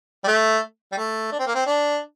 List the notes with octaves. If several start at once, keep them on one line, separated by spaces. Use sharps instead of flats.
G3
A3
G3
A3
D4
C4
A#3
C4
D4